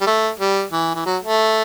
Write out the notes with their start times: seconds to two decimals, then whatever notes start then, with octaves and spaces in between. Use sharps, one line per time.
0.01 G3
0.06 A3
0.40 G3
0.72 E3
0.95 E3
1.05 F#3
1.23 A3